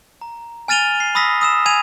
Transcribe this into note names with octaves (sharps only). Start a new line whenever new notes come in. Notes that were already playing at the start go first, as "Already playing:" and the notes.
A#5
G#5 F6 A6 D#7 F7 G7
C7
B5 D#6 E6 A#6 B6
D#6 E6 E7
G#5 G#6 D#7 F7